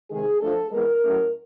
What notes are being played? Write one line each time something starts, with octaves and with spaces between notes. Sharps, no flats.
C3 D#3 G#3 G#4
F3 A3 D4 A4
E3 G#3 B3 A#4
A2 F#3 A3 C#4